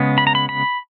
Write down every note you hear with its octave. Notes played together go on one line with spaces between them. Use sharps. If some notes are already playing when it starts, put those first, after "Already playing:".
Already playing: C#3 G#3 B3
B5
A#5
B5
B5